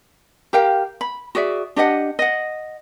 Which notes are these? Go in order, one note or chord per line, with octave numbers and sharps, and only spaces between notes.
G4 A#4 F5 G5
B5
F#4 G#4 D5 E5
D4 G4 D#5 F#5
D#5 F#5